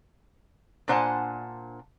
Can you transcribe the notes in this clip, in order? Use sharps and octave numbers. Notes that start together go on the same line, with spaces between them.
A#2 D4 C5 F#5 G#5 A5